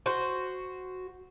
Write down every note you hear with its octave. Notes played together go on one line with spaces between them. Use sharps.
F#4 C5